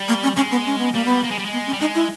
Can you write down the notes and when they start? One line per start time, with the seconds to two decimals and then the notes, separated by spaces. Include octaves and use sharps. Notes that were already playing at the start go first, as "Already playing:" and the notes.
Already playing: G3
0.08 A#3
0.23 C#4
0.36 G#3 C#4
0.51 B3
0.66 C#4
0.78 B3
0.93 G3 A#3
1.05 B3
1.24 A#3
1.31 G#3
1.38 G3
1.45 G#3
1.53 B3
1.66 C#4
1.73 G3
1.80 G#3 D#4
1.95 E4